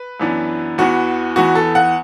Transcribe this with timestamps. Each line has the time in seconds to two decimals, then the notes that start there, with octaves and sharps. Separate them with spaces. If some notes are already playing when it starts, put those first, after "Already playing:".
Already playing: B4
0.20 F#2 E3 B3 D4
0.78 E2 E3 B3 F#4
1.36 E2 E3 B3 F#4
1.55 A4
1.75 F#5